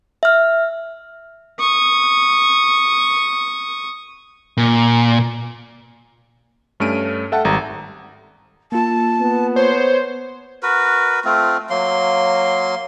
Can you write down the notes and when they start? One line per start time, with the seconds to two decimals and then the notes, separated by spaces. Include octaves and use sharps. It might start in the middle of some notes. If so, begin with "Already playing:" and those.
0.23 E5 F6
1.60 C#6 D#6
4.57 A#2
6.80 G2 A3 C#4 F6 D7 D#7
7.32 A4 E5 F#5 G5 A5
7.45 G#1 G3 A#5
8.72 A#3 F4 A5
9.21 B3
9.56 C5 C#5
10.63 F#4 A#4 B4
11.25 A3 C4 F4
11.70 F#3 A#3 C6